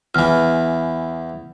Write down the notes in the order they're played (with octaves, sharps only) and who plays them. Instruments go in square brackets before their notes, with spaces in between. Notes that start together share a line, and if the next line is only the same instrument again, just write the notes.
[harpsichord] E2 E3 [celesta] G#5 F6